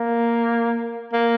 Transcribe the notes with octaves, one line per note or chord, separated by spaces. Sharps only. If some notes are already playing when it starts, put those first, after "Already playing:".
Already playing: A#3
A#3